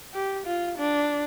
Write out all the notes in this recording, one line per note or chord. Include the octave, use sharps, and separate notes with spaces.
G4
F4
D4